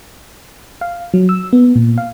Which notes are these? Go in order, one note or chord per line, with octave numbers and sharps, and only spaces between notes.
F5
F#3
E6
B3
A#2
F5